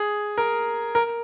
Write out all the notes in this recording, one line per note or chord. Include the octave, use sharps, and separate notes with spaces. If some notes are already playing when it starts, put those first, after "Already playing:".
Already playing: G#4
A#4
A#4